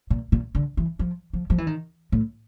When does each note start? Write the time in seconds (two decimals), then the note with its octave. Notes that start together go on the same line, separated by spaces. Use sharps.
0.10 A#2
0.32 A#2
0.55 D3
0.77 E3
0.99 F3
1.33 F3
1.50 F3
1.58 E3
1.67 D#3
2.12 A2